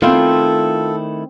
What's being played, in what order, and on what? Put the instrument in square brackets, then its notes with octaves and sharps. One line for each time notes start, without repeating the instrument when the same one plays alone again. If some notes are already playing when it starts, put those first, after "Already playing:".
[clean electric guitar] D#3 A3 E4 [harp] C4 G5 [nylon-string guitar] F4 [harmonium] A4